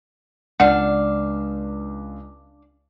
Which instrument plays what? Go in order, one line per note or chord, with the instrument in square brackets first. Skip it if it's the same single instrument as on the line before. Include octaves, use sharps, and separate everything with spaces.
[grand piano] C#2 [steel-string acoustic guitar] D4 F5 [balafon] F#5